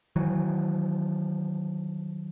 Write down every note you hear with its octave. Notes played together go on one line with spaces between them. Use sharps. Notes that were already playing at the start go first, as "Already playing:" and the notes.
D#3 E3 F#3